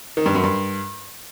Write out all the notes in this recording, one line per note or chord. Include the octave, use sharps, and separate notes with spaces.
D#3
G2
F#2
G2